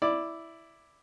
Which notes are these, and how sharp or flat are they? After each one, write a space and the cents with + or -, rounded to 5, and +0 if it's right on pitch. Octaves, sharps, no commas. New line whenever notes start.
E4 +0 D5 +0